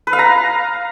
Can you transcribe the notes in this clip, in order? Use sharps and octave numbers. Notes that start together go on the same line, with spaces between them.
B4
F5
A#5